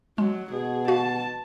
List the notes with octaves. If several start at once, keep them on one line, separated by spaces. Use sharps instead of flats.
F#3 G#3
B2 G#4
F#4 F5 A5